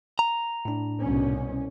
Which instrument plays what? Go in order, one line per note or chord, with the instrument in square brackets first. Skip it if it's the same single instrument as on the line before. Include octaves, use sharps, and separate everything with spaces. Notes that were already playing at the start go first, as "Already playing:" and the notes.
[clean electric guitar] A#5
[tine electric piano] A2 D4
[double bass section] C2 B2 C#4